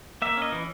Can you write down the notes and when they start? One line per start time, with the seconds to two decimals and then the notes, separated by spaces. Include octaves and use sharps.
0.22 A#3 E5
0.37 C#4 D#5
0.52 E3